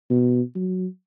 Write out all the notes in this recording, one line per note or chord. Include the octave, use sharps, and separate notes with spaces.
B2
F#3